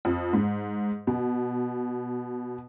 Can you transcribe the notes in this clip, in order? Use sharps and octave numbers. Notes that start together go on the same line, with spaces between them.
F2
G#2
B2